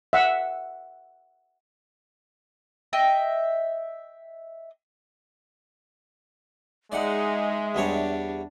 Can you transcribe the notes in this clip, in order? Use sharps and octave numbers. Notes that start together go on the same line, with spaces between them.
E5 F#5
D#5 E5 G5
G#3 D#4 D5 E5 F#5
E2 G3 D4 C#5